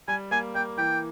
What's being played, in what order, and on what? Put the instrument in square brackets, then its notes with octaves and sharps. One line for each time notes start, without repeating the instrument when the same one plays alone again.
[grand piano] G3 [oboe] G#5
[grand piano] A#3 [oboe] G#5
[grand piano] A#3 [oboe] G5
[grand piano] E3 [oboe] G5